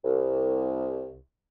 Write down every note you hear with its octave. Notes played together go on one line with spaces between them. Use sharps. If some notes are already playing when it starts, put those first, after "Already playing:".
C2